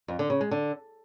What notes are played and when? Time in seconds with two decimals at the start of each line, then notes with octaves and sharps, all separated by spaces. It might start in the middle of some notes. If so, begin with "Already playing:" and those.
0.08 F2
0.19 D3
0.30 C#3
0.41 G#3
0.51 D3